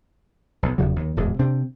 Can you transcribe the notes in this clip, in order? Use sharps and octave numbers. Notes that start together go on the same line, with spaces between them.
B1
F1 E2 C#3 F#3
D#2
D1 E2 G#2 G#3
C3 C4 D4